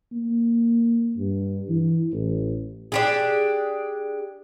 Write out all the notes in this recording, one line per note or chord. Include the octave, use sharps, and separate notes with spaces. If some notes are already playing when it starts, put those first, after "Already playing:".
A#3
G2
E3
A1
D4 G4 G#4